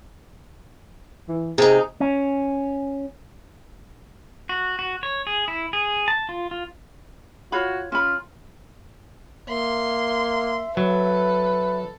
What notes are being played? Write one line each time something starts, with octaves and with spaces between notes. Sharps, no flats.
E3
C3 D#4 G#4
C#4
F#4
F#4
C#5
G#4
E4
G#4
A5
F4
F4
F4 F#4 C#5 B5
C#4 F4 B5
A#3 E5 C6
F#3 A4 B4